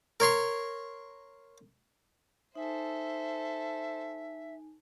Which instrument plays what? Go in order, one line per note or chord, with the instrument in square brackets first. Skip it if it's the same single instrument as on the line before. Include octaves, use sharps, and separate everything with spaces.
[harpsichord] A#4 C#5 C6 C#6
[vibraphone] D#4 G#5 [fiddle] A4 C5 [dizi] E5